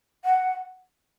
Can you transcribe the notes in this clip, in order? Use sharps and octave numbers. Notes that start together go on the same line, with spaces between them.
F#5